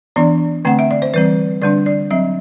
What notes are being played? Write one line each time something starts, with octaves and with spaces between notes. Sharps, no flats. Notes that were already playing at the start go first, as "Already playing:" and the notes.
E3 B3 D4 D5
D3 A3 C4 F#5
E5
D5
C5
E3 G3 C4 B4
D3 G3 D4 D5
D5
F#3 C4 E5